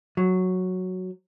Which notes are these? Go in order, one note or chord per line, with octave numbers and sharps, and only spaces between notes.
F#3